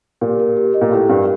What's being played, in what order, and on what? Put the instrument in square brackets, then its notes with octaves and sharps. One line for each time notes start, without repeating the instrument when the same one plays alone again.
[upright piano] A#2 [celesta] G4
[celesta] A#4
G4
D#5
[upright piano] A#2
[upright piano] A2 [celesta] G4
[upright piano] G2 [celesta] A#4